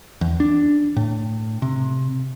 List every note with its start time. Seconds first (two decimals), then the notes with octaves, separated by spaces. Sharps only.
0.21 E2
0.40 D4
0.97 A2
1.62 C3